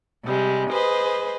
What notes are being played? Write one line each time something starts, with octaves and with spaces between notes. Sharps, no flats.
C3 G3 G#3
G#4 B4 C5 D#5